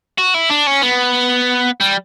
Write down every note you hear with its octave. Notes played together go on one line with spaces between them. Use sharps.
F#4
E4
D4
C#4
B3
G3